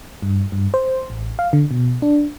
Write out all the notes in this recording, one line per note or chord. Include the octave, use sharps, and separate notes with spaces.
G2
G2
C5
A1
F5
D3
B2
D4